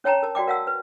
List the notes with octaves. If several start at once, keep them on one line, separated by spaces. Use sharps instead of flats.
C#4 C#5 G5 A5 A#5
A#4 A5
F#4 D5 G5 D6
A#4 F5 F#5 A5 E6
B4